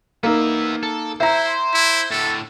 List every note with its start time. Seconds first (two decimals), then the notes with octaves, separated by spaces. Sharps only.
0.23 A#3 B3 D#4 E5
0.83 A4
1.20 E4 C5 E5 A#5
1.74 E4
2.11 A2 D3 A4